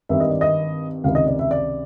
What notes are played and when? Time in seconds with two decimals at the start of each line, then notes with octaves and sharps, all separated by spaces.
0.09 G#1 G2 D#3 E5
0.20 D#5
0.30 D5
0.41 D#5
1.04 C#2 C3 D#3 F5
1.15 D#5
1.27 D5
1.39 E5
1.51 D5